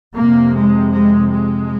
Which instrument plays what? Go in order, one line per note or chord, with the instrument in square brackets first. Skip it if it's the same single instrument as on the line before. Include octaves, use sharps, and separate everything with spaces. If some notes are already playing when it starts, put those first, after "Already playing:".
[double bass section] F2 C3 A#3
G#3
G#3
G#3